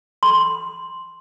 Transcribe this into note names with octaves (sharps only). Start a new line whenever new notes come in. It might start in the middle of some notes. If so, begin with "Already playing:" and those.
C6